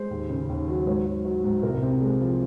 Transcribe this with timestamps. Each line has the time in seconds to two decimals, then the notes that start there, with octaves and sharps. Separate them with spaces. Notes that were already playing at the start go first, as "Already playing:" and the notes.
Already playing: G#3 C5
0.10 D#2
0.29 C#3
0.49 D#2
0.68 F#3
0.86 G#2 C#5
1.06 F#3
1.25 F#3
1.44 G#2
1.63 C2 A#4
1.82 C3
2.01 G#3
2.20 F3